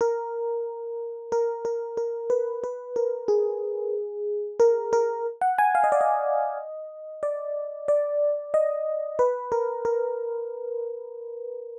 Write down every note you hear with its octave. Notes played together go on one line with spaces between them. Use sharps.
A#4
A#4
A#4
A#4
B4
B4
A#4
G#4
A#4
A#4
F#5
G#5
F5
D#5
D5
D#5
D5
D5
D#5
B4
A#4
A#4